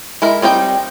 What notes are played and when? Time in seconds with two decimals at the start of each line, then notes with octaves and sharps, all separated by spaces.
0.22 G#3 E4 A#4
0.42 G3 C4 D#4 G5